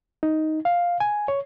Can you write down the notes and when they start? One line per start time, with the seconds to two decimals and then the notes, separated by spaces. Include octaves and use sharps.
0.23 D#4
0.65 F5
1.00 G#5
1.28 C#5